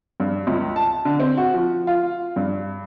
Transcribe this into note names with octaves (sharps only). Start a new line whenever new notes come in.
G2
C#2
A5
D3
C4
F#4
F3
F4
G2